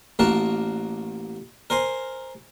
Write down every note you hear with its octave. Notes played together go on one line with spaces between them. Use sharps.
A1 A#3 F#4 A#4 A5
A#4 C5 G#5 C6